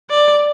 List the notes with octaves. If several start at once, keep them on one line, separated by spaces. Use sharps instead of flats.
D5